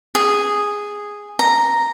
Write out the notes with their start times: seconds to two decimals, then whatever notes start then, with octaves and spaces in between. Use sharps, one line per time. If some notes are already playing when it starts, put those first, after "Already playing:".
0.15 G#4
1.39 A#5